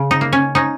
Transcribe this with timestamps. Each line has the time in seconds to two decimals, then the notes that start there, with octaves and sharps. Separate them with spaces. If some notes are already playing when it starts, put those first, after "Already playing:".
Already playing: C#3
0.11 D#4
0.21 A#3
0.33 C#4
0.55 C#4 D#4